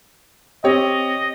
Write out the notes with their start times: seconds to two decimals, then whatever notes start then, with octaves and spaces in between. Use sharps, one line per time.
0.64 C4 G4 C#5 D#5